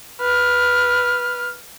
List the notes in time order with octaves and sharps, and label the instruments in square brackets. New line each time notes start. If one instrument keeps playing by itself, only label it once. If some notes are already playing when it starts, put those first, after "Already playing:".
[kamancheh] B4 F6